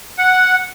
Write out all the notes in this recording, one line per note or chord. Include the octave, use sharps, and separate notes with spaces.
F#5